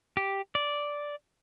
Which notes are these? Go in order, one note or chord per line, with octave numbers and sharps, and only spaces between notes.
G4
D5